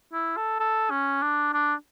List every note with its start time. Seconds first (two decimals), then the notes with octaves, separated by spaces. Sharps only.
0.13 E4
0.37 A4
0.60 A4
0.91 C#4
1.22 D4
1.53 D4